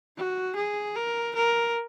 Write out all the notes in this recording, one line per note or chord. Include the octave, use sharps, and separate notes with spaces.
F#4
G#4
A#4
A#4